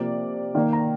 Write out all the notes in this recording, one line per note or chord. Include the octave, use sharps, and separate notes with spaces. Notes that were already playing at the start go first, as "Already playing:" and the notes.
Already playing: C3 F3 A#3 D5
D#3 A#3 D5
A#5